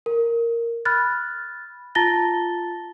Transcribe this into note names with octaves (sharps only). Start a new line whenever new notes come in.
A#4
B5 F6 F#6 A6
F4 A5 A#5 A6 A#6 G7